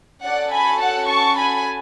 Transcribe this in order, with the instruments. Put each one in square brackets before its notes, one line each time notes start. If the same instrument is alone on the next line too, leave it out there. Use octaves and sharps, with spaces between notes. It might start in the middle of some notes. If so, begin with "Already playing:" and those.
[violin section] C#4 F#4 A4 D5 F#5
G#5 B5
F#5 A5
A5 C#6
G#5 B5